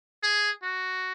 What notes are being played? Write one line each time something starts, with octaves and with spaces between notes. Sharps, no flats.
G#4
F#4